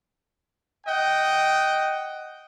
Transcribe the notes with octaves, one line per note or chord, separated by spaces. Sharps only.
D#5 F#5 G5